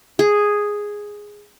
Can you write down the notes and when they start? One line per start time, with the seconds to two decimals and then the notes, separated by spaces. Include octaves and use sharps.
0.19 G#4